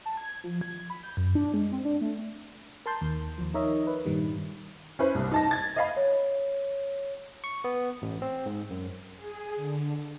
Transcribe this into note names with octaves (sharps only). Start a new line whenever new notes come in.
A5
G#6
F3
G#6
B5
G6
F#2
D4
G#3
C4
D4
A3
A#4 A5 C6 G6
D#2
D#2 F3
D#4 A#4 C#5 D#5 E5
B4
G2 A#2 D#3 G3
C#4 E4 B4 C5
C2 G2
D#4 A5 A#6
G#6 A6
D#5 F5 B5
C#5
C#6
B3
A1
C4
G#2
F#2
G#4
D3